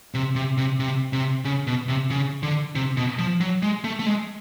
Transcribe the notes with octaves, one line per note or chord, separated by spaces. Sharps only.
C3
C3
C3
C3
C3
C#3
B2
C3
C#3
D3
C3
B2
F3
F#3
G#3
A3
A3
G#3